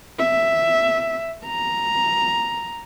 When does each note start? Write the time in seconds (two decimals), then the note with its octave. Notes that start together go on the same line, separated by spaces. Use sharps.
0.20 E5
1.46 A#5